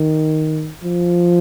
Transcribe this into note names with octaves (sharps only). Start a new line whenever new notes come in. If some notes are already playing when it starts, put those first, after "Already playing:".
Already playing: D#3
F3